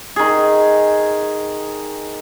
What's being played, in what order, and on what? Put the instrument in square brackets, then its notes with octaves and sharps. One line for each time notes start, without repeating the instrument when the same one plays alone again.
[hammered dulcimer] D#3 G#4